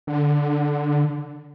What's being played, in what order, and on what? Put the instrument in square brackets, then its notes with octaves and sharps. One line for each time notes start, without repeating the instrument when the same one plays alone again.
[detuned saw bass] D3